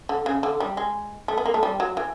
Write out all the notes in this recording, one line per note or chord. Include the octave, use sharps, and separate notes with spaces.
D3
C#3
D3
G3
G#3
A3
B3
A#3
A3
G3
F#3
E3